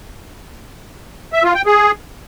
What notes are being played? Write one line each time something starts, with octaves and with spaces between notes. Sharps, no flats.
E5
F4
G5
G#4